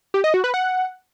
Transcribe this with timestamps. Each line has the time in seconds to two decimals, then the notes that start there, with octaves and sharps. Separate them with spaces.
0.14 G4
0.24 D#5
0.34 F#4
0.44 B4
0.54 F#5